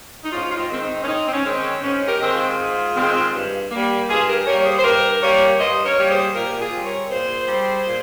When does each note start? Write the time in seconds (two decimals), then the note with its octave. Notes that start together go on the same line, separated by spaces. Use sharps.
0.24 D#4
0.32 G#2 C#4 F4
0.51 F4
0.58 C4 D#4
0.70 D#3 G#3 C4
0.82 C4 D#4
1.03 C#4
1.07 G#2 C4 D#4
1.28 C4
1.33 C#4
1.45 D#3 G#3 C4
1.58 C#4
1.83 G#2 C#4
2.08 G4 A#4
2.21 D#3 G#3 C4
2.33 F4 G#4
2.59 G#2
2.95 D#3 G#3 C4
3.34 G2
3.71 G3 A#3
4.09 G2 F4 G#4
4.28 G4 A#4
4.47 G3 A#3 A#4 C#5
4.60 C#5
4.65 G#4 C5
4.78 C5
4.84 G2 G4 A#4
5.22 G3 A#3 A#4 C#5
5.60 G2 C5 D#5
5.85 A#4 C#5
5.98 G3 A#3 C#5
6.10 G#4 C5
6.35 A#2 G4 A#4
6.60 F4 G#4
6.73 G3 C4
6.85 A#4 C#5
7.10 A#2 G#4 C5
7.48 G3 C4
7.87 A#2